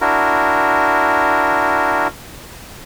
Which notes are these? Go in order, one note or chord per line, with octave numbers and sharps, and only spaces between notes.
D4 E4 F#4 A#4